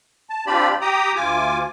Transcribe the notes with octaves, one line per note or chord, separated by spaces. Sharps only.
A5
C4 D4 F4 G4 D5 B5
G4 G5 A#5 D#6
D2 F4 G#5 D6